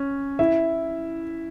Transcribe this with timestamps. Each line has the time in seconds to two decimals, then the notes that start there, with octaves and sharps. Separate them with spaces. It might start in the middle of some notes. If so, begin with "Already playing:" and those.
Already playing: C#4
0.39 E4 E5